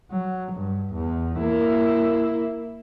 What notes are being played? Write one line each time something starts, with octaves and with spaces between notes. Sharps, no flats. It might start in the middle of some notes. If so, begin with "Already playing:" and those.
F#3
G2
E2
A#3 E4